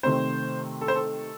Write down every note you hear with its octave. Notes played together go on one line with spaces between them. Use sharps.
C3 D#3 A3 C4 C5
A4
C5
A4